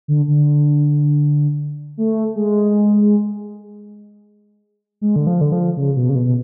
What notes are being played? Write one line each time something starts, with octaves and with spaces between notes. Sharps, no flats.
D3
D3
A3
G#3
G#3
D3
F3
D3
F3
C#3
B2
C#3
B2
B2